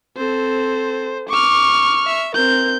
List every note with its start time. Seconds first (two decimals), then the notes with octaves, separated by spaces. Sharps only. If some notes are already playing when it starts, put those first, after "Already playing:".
0.17 C4 A4 C5
1.29 C#6 D6 F6
2.06 E5
2.34 C4 A#4 G6